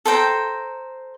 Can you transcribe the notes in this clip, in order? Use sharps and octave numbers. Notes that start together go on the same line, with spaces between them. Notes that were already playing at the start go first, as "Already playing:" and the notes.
A4 C5 G5 A#5